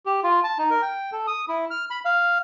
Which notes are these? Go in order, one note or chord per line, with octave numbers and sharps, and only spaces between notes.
G4
F4
A5
D#4
A#4
G5
A4
D#6
E4
F6
B5
F5